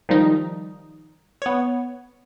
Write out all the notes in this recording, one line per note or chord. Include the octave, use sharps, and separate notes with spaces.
D#3 F3 G3 D#4
B3 C#5